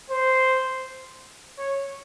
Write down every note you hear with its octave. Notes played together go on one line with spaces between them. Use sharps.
C5
C#5